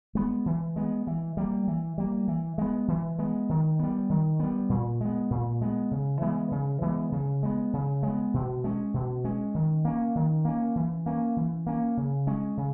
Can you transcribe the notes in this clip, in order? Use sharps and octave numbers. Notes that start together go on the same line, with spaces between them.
G#3 B3
E3
G#3 B3
E3
G3 A#3
E3
G3 A#3
E3
G#3 B3
E3
G#3 B3
D#3
G3 B3
D#3
G3 B3
A#2
G#3 B3
A#2
G#3 B3
C#3
E3 G#3 B3
C#3
E3 G#3 B3
C#3
G#3 B3
C#3
G#3
B3
B2
G#3 C#4
B2
G#3 C#4
D#3
A#3 C#4
D#3
A#3 C#4
E3
A#3 C#4
E3
A#3 C#4
C#3
G#3 C#4
C#3